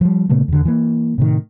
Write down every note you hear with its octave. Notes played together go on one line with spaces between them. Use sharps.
F3 G3
A#2 C#3 A3 B3
E2 D3
E3 A#3
A2 C3 D#3